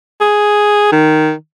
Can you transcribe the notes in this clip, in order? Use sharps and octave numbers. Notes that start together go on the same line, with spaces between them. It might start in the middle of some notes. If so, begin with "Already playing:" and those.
G#4
D#3